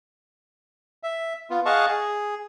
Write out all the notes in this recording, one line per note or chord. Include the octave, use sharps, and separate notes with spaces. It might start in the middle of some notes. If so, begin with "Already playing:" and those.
E5
B3 F4
G#4 D#5 F5 F#5 A5 C#6
G#4